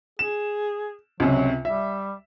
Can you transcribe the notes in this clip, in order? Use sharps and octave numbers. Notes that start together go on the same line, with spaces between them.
G#4 E7
C#2 C3 F#3
G3 E5